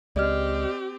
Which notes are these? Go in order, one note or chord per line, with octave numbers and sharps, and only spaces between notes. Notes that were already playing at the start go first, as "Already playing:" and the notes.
C#2 G#3 C4 G4 D5 D#5 F6